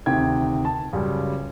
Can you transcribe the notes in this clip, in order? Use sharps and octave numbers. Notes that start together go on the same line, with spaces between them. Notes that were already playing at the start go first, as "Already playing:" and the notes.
D2 C3 D#3 G5 G#6
A5
C#2 F#2 C#3 G3 G4